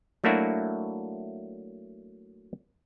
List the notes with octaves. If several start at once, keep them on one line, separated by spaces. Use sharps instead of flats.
F#3 A3 A#3 D4 E4 F#4